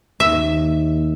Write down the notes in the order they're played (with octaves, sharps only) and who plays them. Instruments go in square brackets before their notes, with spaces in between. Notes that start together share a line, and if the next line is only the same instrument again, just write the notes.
[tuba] D#2 [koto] E5